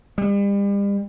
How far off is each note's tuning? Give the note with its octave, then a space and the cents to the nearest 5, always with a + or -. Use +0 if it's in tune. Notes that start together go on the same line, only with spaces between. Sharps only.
G3 +40